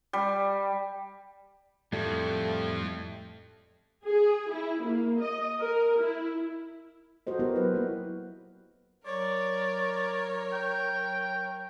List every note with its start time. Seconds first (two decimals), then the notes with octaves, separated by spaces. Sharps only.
0.13 G3
1.93 F2 A2 G3 A3
4.06 G#4
4.52 E4
4.83 A#3
5.20 D#5
5.60 A#4
6.00 E4
7.27 F#4 A4 C5 D#5
7.39 B3 E4 G4 A#4 C5
7.56 F#3 B4
7.74 A#3 E4
9.06 F#3 A#4 C#5 D5
10.53 G5